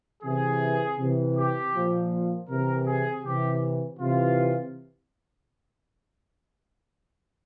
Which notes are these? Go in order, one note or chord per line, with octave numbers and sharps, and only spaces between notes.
C3 E3 G#4
C3 E3
G4
A#2 F3
C3 E3 A#4
G#4
C3 E3 G4
C3 E3 F4